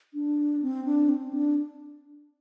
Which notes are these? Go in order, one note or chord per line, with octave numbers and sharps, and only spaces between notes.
D4
C4
D4
C4
D4